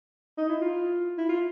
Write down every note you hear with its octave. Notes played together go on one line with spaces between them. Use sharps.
D#4
E4
F4
E4
F4